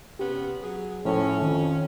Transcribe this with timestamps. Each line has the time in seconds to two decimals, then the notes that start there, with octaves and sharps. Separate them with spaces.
0.19 C3 B3 C#4 G4
0.63 F#3 G#4
1.05 A2 F3 C#4 C5
1.42 F2 D#3